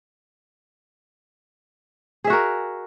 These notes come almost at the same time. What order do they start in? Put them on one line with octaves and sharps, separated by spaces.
G#4 E5 F#4 A#4